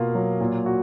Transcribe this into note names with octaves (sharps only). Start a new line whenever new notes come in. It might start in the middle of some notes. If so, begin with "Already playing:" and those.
Already playing: B2 A#3 F4
F#3
A#2
F#4